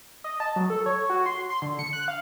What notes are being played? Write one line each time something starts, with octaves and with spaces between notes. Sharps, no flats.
D#5
A5
F#3
A4
C#5
F#4
C6
C6
D3
C#7
F#6
F5